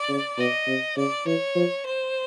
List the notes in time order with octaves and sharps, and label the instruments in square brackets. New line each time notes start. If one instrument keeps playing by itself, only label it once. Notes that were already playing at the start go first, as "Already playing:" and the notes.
Already playing: [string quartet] D5
[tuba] C#3
[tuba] B2 [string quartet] D#5
[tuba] C3
[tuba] C#3 [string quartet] D5
[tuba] E3 [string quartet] C#5
[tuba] F3
[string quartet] C5